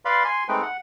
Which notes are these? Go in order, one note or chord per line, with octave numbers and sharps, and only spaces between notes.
B4 D5 F5 B5 C6
G#5 C6
G#3 A3 C4 D#4 B4 G5
F#5